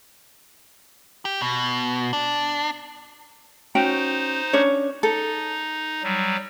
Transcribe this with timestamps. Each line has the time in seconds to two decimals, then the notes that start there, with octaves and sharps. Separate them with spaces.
1.25 G4
1.42 B2
2.13 D4
3.75 C#4 D#4 F#4 C5 G5
4.53 C#4 D4 C#5
5.03 D#4 A4
6.03 F#3 G3